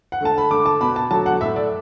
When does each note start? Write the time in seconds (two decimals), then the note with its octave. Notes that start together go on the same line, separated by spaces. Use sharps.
0.12 F#5
0.21 D3 A3 A5
0.38 B5
0.51 D3 A3 D6
0.66 A5
0.80 B2 B3 B5
0.96 A5
1.11 D3 F#3 A3 A5
1.26 F#5
1.41 A2 A3 E5
1.56 D5